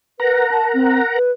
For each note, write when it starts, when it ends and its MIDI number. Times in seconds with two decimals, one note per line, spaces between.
0.20 1.19 70
0.20 0.45 71
0.20 1.19 78
0.20 1.19 82
0.51 0.67 81
0.74 1.00 60
1.15 1.32 71